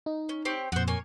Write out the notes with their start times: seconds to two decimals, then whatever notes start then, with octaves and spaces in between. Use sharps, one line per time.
0.06 D#4
0.29 C#4
0.45 C4 G4 C#5
0.72 F2 A#2 F#4 C5
0.87 A#3 C#5 G#5